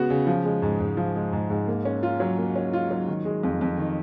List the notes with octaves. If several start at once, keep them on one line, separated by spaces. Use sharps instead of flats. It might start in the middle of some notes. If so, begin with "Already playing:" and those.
Already playing: C#3 G#3 B3 F#4
C#3
F3
G#3
G#2
G#2
F3
G#3
G#2
G#2
A#3
C#4
F4
F#3
A#3
C#4
F4
F#3
D#3
G#3
F2
F2
D#3